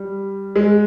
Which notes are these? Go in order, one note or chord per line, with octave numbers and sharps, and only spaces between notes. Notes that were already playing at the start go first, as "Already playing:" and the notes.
Already playing: G3
G#3